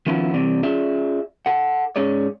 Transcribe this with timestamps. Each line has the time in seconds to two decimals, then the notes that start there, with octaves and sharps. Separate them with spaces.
0.06 D#3 F3 B3 C#4 E4 F4
0.34 C3 E3 G3 C4 D5
0.63 C#4 F4 G#4 D5 E5
1.46 A4 F#5
1.96 G#2 C#4 G#4 C#5 D5